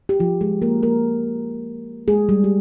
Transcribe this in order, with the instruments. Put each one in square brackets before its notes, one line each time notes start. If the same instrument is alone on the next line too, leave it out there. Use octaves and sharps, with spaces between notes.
[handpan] G4
F3 F4
G#3 G#4
A#3 A#4
A#3 A#4
G#3 G#4
G3 G4
G4